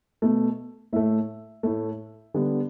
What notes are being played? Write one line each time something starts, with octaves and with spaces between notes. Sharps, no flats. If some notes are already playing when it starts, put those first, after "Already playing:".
B2 A3
A2 A3 E5
A2 A3
D3 G3 B3